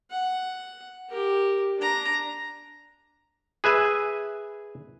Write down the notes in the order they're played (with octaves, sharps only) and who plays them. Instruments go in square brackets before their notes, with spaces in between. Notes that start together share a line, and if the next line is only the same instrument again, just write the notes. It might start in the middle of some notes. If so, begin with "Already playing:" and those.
[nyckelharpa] F#5
G4 A#4
D4 A#5
[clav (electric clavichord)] G#4 B4 E5 G#5